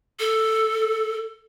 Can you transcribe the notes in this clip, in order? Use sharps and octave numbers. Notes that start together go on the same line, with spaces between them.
A4